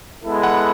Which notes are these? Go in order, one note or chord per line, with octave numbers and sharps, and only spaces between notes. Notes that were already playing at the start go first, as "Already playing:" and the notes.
G#3 B3 E4 A4
F#5